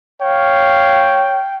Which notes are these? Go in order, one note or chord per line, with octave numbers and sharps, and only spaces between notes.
C#5 F5 G5